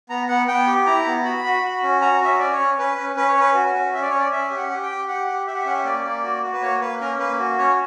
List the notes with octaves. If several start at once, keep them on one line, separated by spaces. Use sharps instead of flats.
B3 A#5
B3 F#5
B3 G5
G4
E4 A#5
B3
F#4 B5
F#4
F#4
C#4
F#4 A#5
C#4 E5
C#4 D5
C#5
C#4
C#4 B4
C#4
C#4 B4
C#5
C#4 B4
F#4
C#4
C#4 E5
D5
C#4 C#5
D5
C#4 E5
G4
F#5
G4
G5
G4
G4 F#5
G4
G4 E5
F#5
E5
C#4 F#5
E5
A#3 D5
A#3
F#4
F#4
B4
A#3 C#5
A#3 B4
C#4 A#4
A#3 B4
F#4
C#4 C#5